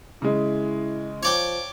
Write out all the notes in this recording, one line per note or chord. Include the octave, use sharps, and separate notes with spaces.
C#3 G#3 E4
F3 C#5 D5 G5